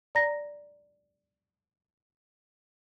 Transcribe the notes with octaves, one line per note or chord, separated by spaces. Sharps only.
D5 A#5 A#6